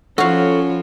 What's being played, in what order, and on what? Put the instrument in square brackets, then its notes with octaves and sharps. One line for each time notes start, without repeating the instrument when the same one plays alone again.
[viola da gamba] F3 [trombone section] C#4 [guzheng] F#4 F5 [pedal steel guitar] A4 C#5 B5